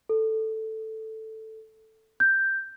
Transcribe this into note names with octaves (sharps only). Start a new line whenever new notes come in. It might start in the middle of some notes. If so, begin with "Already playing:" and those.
A4
G6